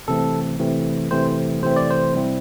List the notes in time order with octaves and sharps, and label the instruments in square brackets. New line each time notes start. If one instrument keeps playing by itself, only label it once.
[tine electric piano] C3 E3 A3 C4 A4
C3 E3 A3 C4
C3 E3 A3 C4 C5
C3 E3 A3 C4 C5
D5
C5
C3 G3 C4 E4